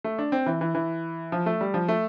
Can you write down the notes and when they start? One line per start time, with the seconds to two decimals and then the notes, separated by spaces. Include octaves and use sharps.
0.04 A3
0.18 D4
0.32 C4
0.46 E3
0.61 E3
0.75 E3
1.32 F3
1.46 A3
1.61 G3
1.74 F3
1.88 A3